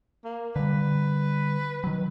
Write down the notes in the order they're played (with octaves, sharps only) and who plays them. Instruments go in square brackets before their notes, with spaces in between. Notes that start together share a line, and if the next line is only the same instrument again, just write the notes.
[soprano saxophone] A#3
[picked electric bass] D3 G3 [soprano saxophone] B4
[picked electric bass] D#3 F#3